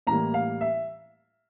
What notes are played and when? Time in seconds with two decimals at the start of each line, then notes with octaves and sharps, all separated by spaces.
0.07 A2 E3 G3 A#3 A#5
0.34 F5
0.61 E5